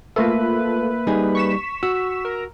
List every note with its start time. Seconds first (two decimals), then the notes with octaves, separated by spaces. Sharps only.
0.16 A3 A#3 F4 A4 B4 E5
1.07 G3 D#4 G#4
1.35 C#6 B6 E7
1.83 F#4 E6
2.25 A#4